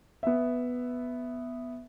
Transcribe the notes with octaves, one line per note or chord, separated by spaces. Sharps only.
B3 E5